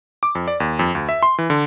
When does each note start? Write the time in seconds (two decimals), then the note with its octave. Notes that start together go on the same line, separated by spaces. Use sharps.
0.23 D6
0.35 F2
0.48 D5
0.60 D#2
0.79 F2
0.95 D2
1.09 E5
1.23 C6
1.38 E3
1.50 D3